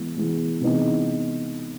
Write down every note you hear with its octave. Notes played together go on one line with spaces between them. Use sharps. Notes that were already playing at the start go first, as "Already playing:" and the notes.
Already playing: E3 G#3 B3
E3 G#3 B3
C3 E3 G#3 B3 D#4